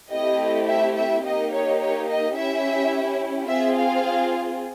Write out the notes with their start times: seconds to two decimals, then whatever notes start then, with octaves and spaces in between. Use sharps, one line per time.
0.11 A3 C4 E4 G4 D#5
0.67 E5
0.95 E5
1.24 A#3 D#4 G4 D#5
1.51 C#5
1.79 C#5
2.07 D#5
2.35 C#4 E4 G4 E5
3.48 C4 F4 G#4 E5
3.75 F5